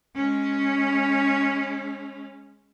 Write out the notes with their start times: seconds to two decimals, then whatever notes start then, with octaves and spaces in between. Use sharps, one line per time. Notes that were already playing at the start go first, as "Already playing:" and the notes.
0.15 G#3 C#4